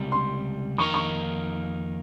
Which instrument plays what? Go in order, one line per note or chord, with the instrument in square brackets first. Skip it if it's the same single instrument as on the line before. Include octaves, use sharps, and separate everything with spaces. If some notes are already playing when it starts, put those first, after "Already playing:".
Already playing: [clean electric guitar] C#2 C3 G3
[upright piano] C6
[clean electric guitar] F2 D#3 A#3 D#4 A#4 [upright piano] C#6
[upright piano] C#6